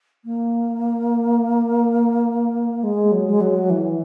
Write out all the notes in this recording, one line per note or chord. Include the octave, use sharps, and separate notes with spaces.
A#3
G#3
F#3
G#3
F#3
E3